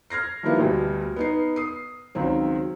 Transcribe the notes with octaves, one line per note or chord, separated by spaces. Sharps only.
F6 G#6 A#6 C7
D#3 F3 G3 A#3 B3 E4
D2 B2 G3
B3 D#4 C7
D#6 C7
C#2 D#3 F#3 C4